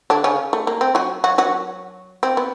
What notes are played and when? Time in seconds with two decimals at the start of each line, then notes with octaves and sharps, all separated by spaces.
0.10 D3 D4
0.24 C#3 C#4
0.53 A3
0.67 A#3
0.81 C4
0.95 F#3 F#4
1.24 F#3 F#4
1.38 F#3 F#4
2.23 C4
2.37 B3